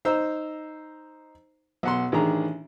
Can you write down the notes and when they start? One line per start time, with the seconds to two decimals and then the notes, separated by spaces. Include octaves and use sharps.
0.05 D#4 C5 A#5 E6
1.83 B1 F#5 C6
2.12 A1 D#3 D4 G#4 A#5